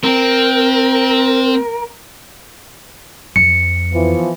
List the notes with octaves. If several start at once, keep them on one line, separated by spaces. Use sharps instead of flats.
C4 A#4
F2 C#7
E3 F3 B3